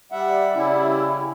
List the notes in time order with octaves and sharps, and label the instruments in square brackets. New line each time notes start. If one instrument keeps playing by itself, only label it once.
[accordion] G3 [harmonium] E5 F#5
[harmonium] C#3 C#4 [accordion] G3 E4